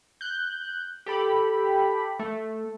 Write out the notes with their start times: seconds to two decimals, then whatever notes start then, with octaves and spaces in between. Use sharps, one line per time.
0.21 F#6 G6
1.06 G4 A4 B5
2.19 A3